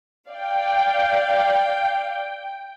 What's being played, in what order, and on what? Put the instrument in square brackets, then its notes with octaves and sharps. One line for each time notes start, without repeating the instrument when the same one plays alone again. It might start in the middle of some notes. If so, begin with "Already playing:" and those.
[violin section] D5 F5 [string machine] G5